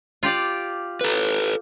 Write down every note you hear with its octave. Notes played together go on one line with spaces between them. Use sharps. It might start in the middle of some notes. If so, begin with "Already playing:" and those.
F4 G4 D5
A4 B4